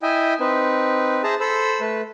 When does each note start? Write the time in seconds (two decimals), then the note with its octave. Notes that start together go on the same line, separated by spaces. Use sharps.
0.02 E4 D#5 E5 G5 G#5
0.40 C4 D#4 B4
1.24 G#4 C5 E5 A5 A#5
1.40 A4 C5 B5 E6
1.81 A3 B4